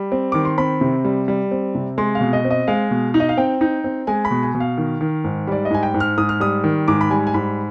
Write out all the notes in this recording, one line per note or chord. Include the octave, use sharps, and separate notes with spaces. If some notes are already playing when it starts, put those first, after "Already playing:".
Already playing: G3
C4
D#3 D6
C6
C4 B5
C3
G3
G3
C4
C3
G#3 C6
F5
B2
D#5
C4
D#5
G#3 F5
B2
D#4
D#5
F5
C4 G5
D#4
C4
G#3 G#5
B5
B2
G#5
B2
F5
D#3
D#3
G#2
G3 D5
D#5
G#2 G#5
G5
G#2
F6
G#2 D#6
F6
G3 D#6
D#3
G#2 D6
B5
G3 G#5
G#5
G#2 B5